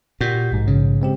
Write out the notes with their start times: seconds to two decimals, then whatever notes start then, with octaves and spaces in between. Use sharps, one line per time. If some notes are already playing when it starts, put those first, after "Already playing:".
0.21 A#2 F#4 G4 G6
0.51 A#1 G#2 B2
0.67 C#3
1.02 G#3 C4 G4